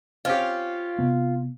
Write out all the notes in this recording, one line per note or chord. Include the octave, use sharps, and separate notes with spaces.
C4 C#4 F4 G4
C3 B3